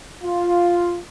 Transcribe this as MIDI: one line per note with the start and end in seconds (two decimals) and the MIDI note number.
0.24 0.98 65